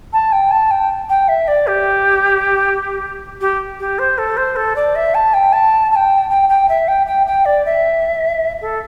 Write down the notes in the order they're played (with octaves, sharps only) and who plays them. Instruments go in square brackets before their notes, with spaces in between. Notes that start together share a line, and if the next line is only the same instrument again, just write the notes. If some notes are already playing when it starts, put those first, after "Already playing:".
[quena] A5
G5
A5
G5
G5
E5
D5
G4
G4
G4
C5
A4
C5
A4
D5
E5
A5
G5
A5
A5
G5
G5
G5
E5
G5
G5
G5
D5
E5
A4